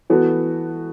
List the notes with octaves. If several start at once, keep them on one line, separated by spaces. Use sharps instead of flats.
E3 B3 F#4 A4